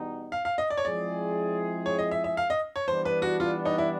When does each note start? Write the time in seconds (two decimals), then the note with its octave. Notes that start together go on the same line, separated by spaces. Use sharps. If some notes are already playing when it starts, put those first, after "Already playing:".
Already playing: E2 B2 G3 B3 D#4
0.32 F5
0.45 F5
0.58 D#5
0.70 D5
0.77 C#5
0.84 F3 G#3 C4 E4 G#4 D5
1.86 C#5
1.99 D#5
2.11 E5
2.24 E5
2.37 F5
2.50 D#5
2.76 C#5
2.88 E3 G3 B3 D4 C5
3.05 B4
3.22 F#4
3.40 F4
3.65 D#4
3.78 E4